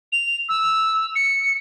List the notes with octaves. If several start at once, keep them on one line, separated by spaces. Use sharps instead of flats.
F7
E6
C#7